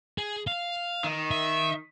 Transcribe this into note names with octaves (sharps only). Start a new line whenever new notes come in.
G#4
F5
D#3
E5